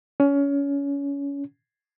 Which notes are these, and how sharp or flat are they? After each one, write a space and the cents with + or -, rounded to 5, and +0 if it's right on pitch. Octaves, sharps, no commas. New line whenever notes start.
C#4 +25